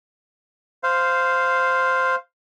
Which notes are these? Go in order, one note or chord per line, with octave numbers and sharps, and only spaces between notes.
C5 F5